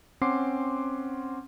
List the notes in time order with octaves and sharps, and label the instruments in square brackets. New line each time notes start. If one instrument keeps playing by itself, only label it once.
[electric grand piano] C4 C#4 F#5 C6 D6 C7